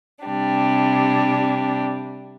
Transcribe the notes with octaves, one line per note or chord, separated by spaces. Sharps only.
C3 G3 D4